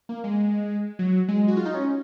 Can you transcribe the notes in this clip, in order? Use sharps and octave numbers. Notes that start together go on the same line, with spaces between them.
A#3
G#3
F#3
G#3
F#4
F4
D#4
C#4